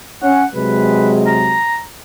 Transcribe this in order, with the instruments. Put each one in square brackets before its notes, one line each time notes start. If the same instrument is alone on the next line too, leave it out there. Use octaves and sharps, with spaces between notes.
[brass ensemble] C#4 [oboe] F#5
[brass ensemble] C3 F#3 G#3 [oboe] B4
[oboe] A#5